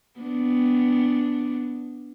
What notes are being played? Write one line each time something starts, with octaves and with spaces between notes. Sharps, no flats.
B3 D4